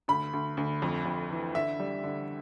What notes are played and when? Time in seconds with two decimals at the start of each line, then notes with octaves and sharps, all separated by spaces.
0.08 D2 B5
0.33 D2
0.57 D2
0.82 F2
1.06 F2
1.31 E3
1.55 D3 E5
1.80 G3
2.03 D3